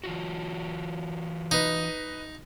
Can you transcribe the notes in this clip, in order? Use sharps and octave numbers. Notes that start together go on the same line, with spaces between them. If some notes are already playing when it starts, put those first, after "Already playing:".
E3 F4 F#4
D#4 B4 D#5